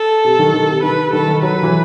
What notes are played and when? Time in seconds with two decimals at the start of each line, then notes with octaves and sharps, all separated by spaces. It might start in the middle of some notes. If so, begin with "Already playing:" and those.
Already playing: A4
0.25 C3
0.39 D#3
0.54 D#3
0.69 C3
0.83 D#3 B4
1.13 D#3 A4
1.28 D#3
1.42 F#3 B4
1.63 E3